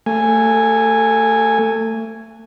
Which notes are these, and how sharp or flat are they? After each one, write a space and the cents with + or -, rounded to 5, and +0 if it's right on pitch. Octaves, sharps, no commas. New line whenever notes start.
A3 +30 G#5 -5